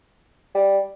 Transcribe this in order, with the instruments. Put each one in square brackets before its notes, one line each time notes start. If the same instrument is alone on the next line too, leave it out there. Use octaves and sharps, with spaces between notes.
[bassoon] G3